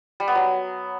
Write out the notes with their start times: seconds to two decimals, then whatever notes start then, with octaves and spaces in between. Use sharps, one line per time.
0.20 G3
0.28 B3
0.35 F#3